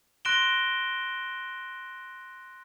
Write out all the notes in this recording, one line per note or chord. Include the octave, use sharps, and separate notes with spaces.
C6 F#6 A#6 D7 E7 G7